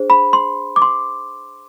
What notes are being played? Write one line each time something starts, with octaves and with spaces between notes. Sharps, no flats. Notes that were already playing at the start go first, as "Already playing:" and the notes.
Already playing: D4 G#4 C5
B5
C6
D6
C6